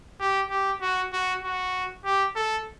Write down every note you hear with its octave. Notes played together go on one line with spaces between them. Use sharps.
G4
G4
F#4
F#4
F#4
G4
A4